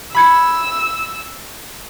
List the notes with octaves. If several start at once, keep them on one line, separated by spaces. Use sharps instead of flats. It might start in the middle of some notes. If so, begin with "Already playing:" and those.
B5 E6 G#6 C#7